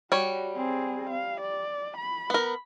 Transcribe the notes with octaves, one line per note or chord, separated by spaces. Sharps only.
G3 F#4 C#5
C4 G#4
F5
D5
B5
B3 A#4